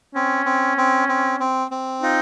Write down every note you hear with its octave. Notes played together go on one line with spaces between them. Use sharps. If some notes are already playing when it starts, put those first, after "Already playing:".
C4 C#4
C4
C4
C4
C4
C4
D#4 F4